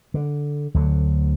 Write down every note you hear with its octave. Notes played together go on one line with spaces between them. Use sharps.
D3
D2 D3 F#3